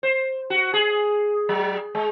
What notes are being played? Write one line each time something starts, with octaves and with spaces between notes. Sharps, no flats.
C5
F#4
G#4
F#3
G#3